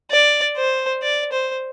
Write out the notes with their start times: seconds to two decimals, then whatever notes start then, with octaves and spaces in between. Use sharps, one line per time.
0.12 D5
0.57 C5
1.03 D5
1.32 C5